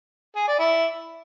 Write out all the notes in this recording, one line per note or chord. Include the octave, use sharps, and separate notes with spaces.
G#4
D5
E4